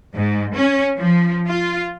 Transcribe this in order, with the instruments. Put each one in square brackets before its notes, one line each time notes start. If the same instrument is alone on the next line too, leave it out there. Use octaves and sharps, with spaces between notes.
[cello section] G#2
C#4
F3
F4